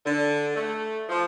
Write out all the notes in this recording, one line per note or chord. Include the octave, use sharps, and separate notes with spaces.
D3
A3
F3